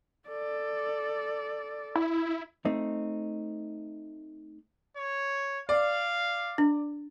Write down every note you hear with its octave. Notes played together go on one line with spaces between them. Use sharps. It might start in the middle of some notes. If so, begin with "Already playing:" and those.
A4 D5
E4
A3 C4 D#4
C#5
D5 F5
D4